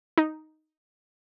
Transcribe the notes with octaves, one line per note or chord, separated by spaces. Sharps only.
D#4